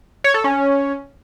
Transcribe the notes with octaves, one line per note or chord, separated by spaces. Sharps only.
C#5
A4
C#4